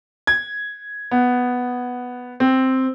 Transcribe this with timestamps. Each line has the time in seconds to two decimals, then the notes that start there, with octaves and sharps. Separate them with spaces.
0.27 G#6
1.11 B3
2.40 C4